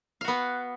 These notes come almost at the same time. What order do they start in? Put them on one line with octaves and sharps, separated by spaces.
F5 F#4 B3